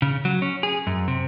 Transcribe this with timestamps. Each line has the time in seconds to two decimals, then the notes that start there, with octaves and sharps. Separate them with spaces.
0.02 C#3
0.25 F#3
0.42 C#4
0.63 G#4
0.87 F#2
1.08 C3